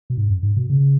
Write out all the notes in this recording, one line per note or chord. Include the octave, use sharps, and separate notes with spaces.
B2
G#2
F#2
G#2
B2
C#3